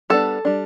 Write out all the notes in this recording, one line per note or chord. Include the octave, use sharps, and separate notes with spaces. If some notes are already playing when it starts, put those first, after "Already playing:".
G3 B3 D4 A4
G3 D4